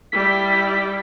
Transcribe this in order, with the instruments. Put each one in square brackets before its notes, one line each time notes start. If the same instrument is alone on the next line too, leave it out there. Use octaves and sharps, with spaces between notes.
[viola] G3 E4 [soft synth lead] B6